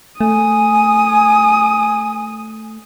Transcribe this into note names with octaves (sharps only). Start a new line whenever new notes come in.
A3 G#5 D#6